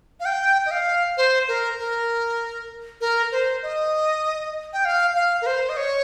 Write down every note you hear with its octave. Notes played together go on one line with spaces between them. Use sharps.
F5
G5
D#5
F5
C5
A#4
A#4
A#4
C5
D#5
G5
F5
F5
A#4
C5
D#5
C#5